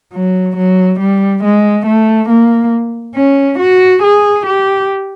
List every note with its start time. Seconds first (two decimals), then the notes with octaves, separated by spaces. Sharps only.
0.13 F#3
0.57 F#3
1.00 G3
1.44 G#3
1.86 A3
2.29 A#3
3.16 C#4
3.59 F#4
4.03 G#4
4.46 G4